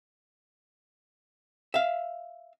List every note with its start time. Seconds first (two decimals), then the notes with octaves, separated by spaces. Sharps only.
1.74 E5 F5